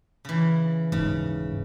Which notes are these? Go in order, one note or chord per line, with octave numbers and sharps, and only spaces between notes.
C#3 E3
D#1 G#2 C#3